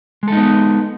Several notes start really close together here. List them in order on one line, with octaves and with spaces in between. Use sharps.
G#3 A4 D#4 B3